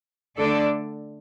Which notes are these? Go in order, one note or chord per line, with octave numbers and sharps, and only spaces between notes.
D3 A3 D4 A4 D5